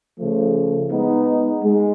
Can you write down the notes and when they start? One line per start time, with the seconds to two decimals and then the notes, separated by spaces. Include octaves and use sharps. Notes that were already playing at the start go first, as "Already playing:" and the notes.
0.17 C#3 F3 A3
0.92 G#3 B3 D#4
1.64 G#3